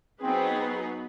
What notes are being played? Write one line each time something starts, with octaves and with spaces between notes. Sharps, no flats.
F#3 B3 C4 D#4 G#4 B4